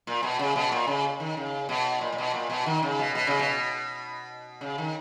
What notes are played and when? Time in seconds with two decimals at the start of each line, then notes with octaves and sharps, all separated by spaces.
0.07 A#2
0.23 B2
0.39 C#3
0.55 B2
0.72 A#2
0.87 C#3
1.20 D#3
1.37 C#3
1.69 B2
2.01 A#2
2.12 A#2
2.18 B2
2.34 A#2
2.50 B2
2.66 D#3
2.83 C#3
2.99 B2
3.15 B2
3.27 C#3
3.39 B2
4.61 C#3
4.78 D#3